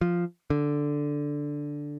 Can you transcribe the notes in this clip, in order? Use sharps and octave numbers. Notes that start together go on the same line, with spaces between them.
F3
D3